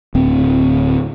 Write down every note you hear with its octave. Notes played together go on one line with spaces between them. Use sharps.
D1 C4